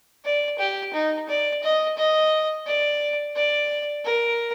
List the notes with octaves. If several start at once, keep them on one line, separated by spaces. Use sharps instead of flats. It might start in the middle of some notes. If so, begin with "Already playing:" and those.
D5
G4
D#4
D5
D#5
D#5
D5
D5
A#4